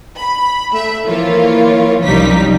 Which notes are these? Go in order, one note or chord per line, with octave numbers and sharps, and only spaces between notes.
B5
A3 E5
E3 F3 A#3 F4 C#5
C2 F#2 F3 G3 D#4 B6